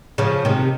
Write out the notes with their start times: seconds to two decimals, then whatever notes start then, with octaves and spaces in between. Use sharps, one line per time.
0.18 C#3 F3
0.45 C3 D#3